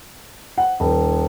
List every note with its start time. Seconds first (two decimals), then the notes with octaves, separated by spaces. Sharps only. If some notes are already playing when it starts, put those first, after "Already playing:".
0.58 F#5
0.80 D#1